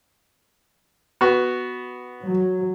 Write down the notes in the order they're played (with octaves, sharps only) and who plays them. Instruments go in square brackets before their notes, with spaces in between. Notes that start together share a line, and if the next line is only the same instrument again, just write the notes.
[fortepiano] B3 F#4
[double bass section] F#3